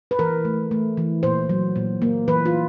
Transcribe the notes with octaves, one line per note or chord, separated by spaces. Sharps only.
B4
E3 A#4
A3
A3
E3
A#2 C5
F#3
A#2
A#3
E3 B4
F4